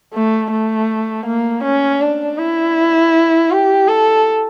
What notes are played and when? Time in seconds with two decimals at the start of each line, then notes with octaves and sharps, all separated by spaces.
0.14 A3
0.51 A3
1.26 A#3
1.64 C#4
2.01 D4
2.38 E4
3.51 G4
3.88 A4